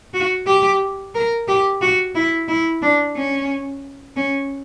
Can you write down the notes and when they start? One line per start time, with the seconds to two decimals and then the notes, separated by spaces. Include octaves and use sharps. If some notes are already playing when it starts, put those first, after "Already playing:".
0.14 F#4
0.47 G4
1.15 A#4
1.48 G4
1.81 F#4
2.15 E4
2.48 E4
2.82 D4
3.16 C#4
4.16 C#4